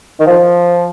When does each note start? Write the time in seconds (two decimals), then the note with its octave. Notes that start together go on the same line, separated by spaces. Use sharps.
0.19 D#3
0.27 F3